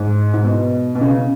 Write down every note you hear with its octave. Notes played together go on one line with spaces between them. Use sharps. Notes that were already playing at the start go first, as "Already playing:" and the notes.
Already playing: G#2
G#2
B2
B2
C#3